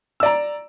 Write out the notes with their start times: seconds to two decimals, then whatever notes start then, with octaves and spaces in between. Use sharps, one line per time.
0.20 E6
0.23 D5
0.26 A#5